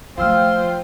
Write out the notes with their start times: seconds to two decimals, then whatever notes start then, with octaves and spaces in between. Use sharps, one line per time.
0.17 F3 A3 F4 C5 F5 G5 E6 F6